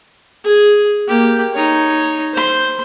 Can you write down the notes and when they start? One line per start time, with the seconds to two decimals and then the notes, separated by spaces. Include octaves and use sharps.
0.44 G#4
1.08 A#3 G4
1.54 D#4 C#5
2.34 C5 C6